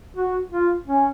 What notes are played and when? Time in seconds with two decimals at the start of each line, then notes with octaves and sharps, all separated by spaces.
0.16 F#4
0.52 F4
0.87 C#4